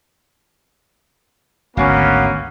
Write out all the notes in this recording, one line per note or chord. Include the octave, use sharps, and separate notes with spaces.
G#1 D2 A#3 B3 C#4 F#4 F5